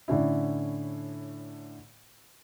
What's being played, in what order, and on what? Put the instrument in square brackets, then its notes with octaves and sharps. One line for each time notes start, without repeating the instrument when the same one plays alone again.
[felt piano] A2 D3 C#4 E4